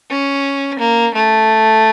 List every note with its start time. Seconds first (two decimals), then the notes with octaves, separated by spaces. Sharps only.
0.11 C#4
0.79 A#3
1.14 A3